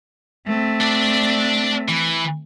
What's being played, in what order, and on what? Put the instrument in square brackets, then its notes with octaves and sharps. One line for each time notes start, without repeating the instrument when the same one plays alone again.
[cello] A3 C4
[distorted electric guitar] D4 D5
E3